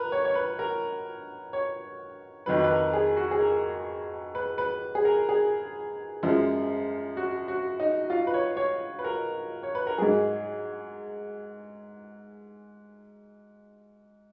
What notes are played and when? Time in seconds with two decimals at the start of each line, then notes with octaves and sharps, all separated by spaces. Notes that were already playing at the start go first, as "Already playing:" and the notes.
Already playing: A#4 B4
0.12 C#5
0.25 C#5
0.35 B4
0.59 A#4
1.53 C#5
2.46 F2 D#3 F#3 B4
2.64 B4
2.71 A#4
2.93 G#4
3.17 F#4
3.31 G#4
3.40 A#4
4.35 B4
4.58 B4
4.95 G#4
5.05 A#4
5.29 G#4
6.23 F#2 F3 G#3
7.17 F#4
7.48 F#4
7.80 D#4
8.10 F4
8.27 B4
8.34 C#5
8.57 C#5
8.99 B4
9.04 A#4
9.63 C#5
9.75 B4
9.87 A#4
9.98 G#2 F#3 G#4